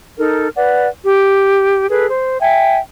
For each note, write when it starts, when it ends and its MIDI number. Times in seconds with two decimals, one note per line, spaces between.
0.18 0.48 63
0.18 0.48 69
0.18 0.48 70
0.55 0.87 71
0.55 0.87 74
0.55 0.87 78
1.04 1.85 67
1.89 2.06 68
1.89 2.06 69
1.89 2.06 71
2.09 2.37 72
2.40 2.77 76
2.40 2.77 79
2.40 2.77 80